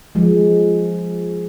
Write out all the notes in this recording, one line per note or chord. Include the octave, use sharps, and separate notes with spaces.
F3 G#3